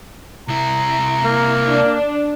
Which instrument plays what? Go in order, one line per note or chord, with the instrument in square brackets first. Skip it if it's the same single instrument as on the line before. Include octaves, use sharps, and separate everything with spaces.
[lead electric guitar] C2 E4 [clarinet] A#5
[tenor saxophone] A#3
[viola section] D4